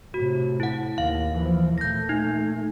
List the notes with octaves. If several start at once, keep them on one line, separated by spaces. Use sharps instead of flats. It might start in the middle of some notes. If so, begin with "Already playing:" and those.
A2 C3 F#4
E4 F#5
D#2 F5
E3 F3
A#2 A3 G6 A#6
D#4